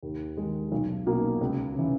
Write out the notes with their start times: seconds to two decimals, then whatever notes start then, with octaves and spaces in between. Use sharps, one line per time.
0.03 D#2
0.37 D#3 G#3
0.72 B1
1.06 B2 A#3
1.41 C#2
1.75 C#3 E3